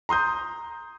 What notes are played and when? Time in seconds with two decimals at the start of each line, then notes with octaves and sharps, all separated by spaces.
0.09 A#5 C6 D#6 G6